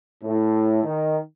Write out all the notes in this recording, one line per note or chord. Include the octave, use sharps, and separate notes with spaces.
A2
D#3